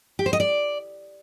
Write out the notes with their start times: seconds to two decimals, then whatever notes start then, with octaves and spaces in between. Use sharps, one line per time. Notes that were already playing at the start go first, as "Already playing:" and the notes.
0.19 G4
0.26 C5
0.33 D#5
0.40 D5